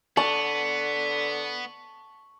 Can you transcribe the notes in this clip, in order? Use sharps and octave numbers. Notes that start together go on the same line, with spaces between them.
D3 B3 A5 C#6 F#7